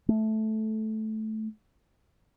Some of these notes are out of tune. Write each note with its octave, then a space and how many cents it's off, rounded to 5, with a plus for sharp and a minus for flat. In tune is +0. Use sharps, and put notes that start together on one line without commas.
A3 -10